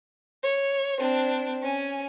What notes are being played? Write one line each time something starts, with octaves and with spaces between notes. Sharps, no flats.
C#5
C4 D4
C#4 G#5